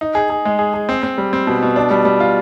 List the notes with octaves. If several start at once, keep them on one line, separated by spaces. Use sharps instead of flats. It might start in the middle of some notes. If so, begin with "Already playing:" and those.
D#4
G#4
G#4
G#3
G#4
G#4
C4
C4
G3
C4
B2
B2
D4
G3
G3
F4